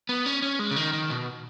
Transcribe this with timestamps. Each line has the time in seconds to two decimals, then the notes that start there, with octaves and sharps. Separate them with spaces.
0.09 B3
0.26 C#4
0.42 C#4
0.59 G#3
0.71 C#3
0.76 D#3
0.93 D#3
1.10 B2